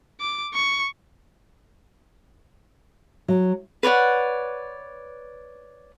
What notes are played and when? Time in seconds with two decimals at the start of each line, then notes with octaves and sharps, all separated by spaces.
0.20 D6
0.54 C#6
3.28 F#3
3.83 B4 C#5 D5 F#5